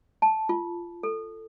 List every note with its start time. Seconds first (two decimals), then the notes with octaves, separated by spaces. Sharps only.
0.22 A5
0.49 F4
1.03 A4